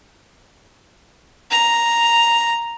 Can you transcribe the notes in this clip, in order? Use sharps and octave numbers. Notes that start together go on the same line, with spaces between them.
A#5